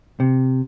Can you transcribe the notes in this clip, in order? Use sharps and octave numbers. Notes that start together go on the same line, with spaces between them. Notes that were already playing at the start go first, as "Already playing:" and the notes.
C3